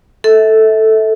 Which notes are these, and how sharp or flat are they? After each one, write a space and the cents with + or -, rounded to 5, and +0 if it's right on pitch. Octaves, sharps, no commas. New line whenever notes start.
A4 +0 E5 -30